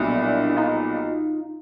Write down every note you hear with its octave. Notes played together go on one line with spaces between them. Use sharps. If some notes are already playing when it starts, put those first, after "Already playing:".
Already playing: B1 A#2 G3 D4 E4
D#4 F4